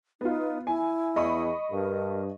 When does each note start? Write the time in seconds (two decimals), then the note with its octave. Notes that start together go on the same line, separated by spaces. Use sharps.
0.21 B3 D#4 F4
0.67 E4 G#5
1.16 E2 D#5 B5 C#6
1.71 G2 A#4